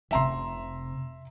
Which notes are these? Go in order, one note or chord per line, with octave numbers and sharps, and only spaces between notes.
F1 C3 E5 A#5 C6